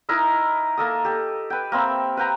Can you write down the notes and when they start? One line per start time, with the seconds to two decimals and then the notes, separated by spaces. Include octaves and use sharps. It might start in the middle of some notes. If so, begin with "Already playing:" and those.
0.09 D#4 E4 A#4 D#5
0.77 A#3 A4 D#6
1.04 G4 A4
1.50 B4 G5
1.72 A#3 C4 E5 B5
2.17 B4 F5 G5 A#5